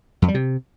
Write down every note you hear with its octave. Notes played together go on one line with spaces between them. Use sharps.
F2
G3
C3